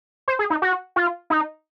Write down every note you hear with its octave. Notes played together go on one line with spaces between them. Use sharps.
C5
G#4
D#4
F#4
F4
D#4